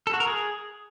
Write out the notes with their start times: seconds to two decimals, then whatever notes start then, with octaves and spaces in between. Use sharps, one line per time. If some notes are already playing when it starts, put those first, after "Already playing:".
0.07 A4
0.13 F#4
0.20 A#4
0.27 G#4